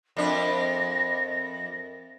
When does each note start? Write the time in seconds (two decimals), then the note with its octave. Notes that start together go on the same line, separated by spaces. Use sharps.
0.17 F2 C4 D4 A#4 E5 A#6